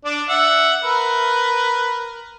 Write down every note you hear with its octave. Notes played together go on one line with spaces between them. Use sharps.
D4 D5
E5 F#5
A#4 B4